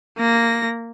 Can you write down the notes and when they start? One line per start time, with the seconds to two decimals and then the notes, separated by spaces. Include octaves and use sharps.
0.18 A#3 A#6